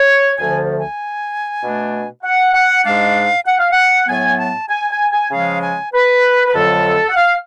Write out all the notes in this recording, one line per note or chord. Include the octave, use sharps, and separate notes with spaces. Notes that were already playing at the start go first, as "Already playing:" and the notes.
Already playing: C#5
D2 D3 F3 A3 G#5
G#5
B2 A3 D4
F#5
F#5
G#2 G#3 D4 F5
F#5
F5
F#5
A2 F#3 B3 G#5
A5
G#5
G#5
G#5
C#3 F3 G#3 F5
G#5
B4
B4
F2 D3 F#3 A3 A4
F#5
F5